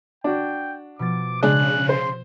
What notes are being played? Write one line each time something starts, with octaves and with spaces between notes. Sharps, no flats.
D4 F#4 G5
B2 F3 D6 A6
C#3 G#3 D4 G#4 F#6
C5 C6